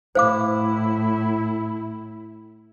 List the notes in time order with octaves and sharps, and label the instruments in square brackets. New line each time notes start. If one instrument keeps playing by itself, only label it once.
[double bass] A2 E4 [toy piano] C5 F5 D6